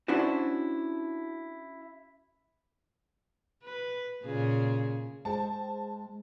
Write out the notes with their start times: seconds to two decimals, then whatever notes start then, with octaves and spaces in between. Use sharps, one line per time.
0.08 C#4 D4 E4 F#4 C5
3.63 B4
4.23 A#2 C#3 G#4
5.25 G#3 G#4 C5 G5 A5